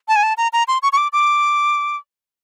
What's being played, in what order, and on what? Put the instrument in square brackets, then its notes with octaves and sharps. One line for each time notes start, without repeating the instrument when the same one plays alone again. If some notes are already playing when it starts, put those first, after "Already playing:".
[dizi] A5
G#5
A5
A#5
A#5
C6
C#6
C#6
D6
D6